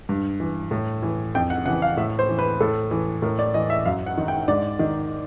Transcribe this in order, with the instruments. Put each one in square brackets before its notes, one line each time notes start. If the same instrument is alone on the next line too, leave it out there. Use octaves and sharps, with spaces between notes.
[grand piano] G2
E3
A2
E3
F2 G5
F#5
C#3 E3 F#5
F5
A2 E5
C5
E3
B4
A2 A4
E3
A2 A#4
D5
E3 D#5
E5
F#2 F5
F#5
D#3
G5
G#2 D5
D#3